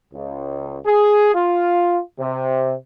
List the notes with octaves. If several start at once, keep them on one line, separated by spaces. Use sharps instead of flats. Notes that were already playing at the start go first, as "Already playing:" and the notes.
C#2
G#4
F4
C3